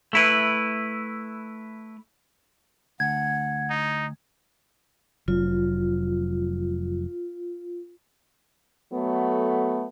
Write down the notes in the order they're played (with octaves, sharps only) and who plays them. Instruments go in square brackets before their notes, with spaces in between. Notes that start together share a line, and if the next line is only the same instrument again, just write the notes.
[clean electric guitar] A3 E4 B4
[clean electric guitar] D2 [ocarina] F#5 [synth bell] G#6
[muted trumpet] D#4
[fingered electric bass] F1 F#3 [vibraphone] F4
[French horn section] F#3 A3 B3 A4